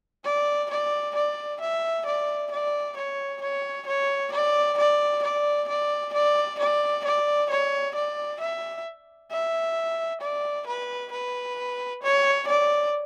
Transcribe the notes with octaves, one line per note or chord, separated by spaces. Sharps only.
D5
D5
D5
E5
D5
D5
C#5
C#5
C#5
D5
D5
D5
D5
D5
D5
D5
C#5
D5
E5
E5
D5
B4
B4
C#5
D5